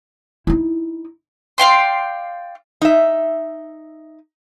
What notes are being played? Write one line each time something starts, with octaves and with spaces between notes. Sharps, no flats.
D#4 E4
D5 F5 G5 C6
D#4 E5